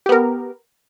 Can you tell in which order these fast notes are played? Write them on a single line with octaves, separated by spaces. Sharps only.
G4 B3 A#4